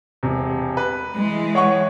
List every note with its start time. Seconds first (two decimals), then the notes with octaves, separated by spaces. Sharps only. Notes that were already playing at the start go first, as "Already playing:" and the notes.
0.23 E1 C3
0.77 B4
1.16 E3 G#3
1.55 C#5 F#5 C#6